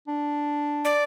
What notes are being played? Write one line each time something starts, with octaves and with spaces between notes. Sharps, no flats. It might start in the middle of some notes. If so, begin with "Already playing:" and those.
D4
D5